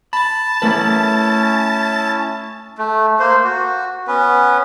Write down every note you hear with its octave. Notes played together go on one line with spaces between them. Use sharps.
A5 B5 A6
A3 C#4 E4 A#4 B4
A3
A#3 C5
F#4
B3 C#4 B4